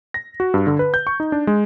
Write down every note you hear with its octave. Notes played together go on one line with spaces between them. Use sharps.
A#6
F#4
G2
D3
B4
G6
C#6
D#4
D4
G#3